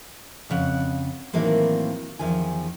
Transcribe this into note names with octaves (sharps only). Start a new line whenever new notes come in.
F2 C#3 F#5
A2 D#3 E3 F#3 A#3 C4
E2 D#3 F3 G#5